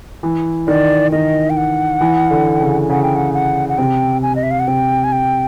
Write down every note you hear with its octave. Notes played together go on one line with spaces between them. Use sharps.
E3
D#3 D5
D#3 D#5
G5
F#5
E3
D3
C#3
C#3 F#5
G5
F#5
F#5
F#5
C3 G5
G#5
D#5
E5
F5
F#5
C3 G5
G#5
G5